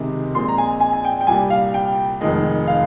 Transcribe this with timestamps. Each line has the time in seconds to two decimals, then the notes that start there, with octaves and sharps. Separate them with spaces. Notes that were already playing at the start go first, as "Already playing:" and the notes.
Already playing: C#2 C3 D#3 G#3
0.34 A#1 A#2 G#3 C4 D#4 C6
0.48 A#5
0.58 G#5
0.80 G#5
0.93 G#5
1.05 G5
1.21 G5
1.27 C2 A#2 G3 G#5
1.50 F5
1.74 G5
2.21 F1 F2 D#3 G#3
2.67 F5